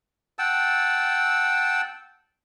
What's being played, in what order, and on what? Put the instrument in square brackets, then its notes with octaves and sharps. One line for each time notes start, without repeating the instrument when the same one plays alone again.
[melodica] F#5 G5 A5 E6